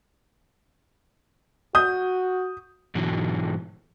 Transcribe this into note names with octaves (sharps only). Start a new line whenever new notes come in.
F#4 D#6 G6
G#2 B2 D3 E3 F#3 G#3